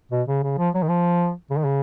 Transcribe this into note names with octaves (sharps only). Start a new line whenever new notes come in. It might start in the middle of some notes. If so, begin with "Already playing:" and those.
B2
C#3
C#3
F3
F#3
D#3
F3
C#3
D#3
C#3